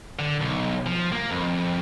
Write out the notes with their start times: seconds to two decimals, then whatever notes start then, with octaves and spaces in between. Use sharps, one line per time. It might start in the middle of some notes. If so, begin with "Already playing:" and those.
0.19 D3
0.41 B1
0.86 F3
1.12 A#3
1.31 F2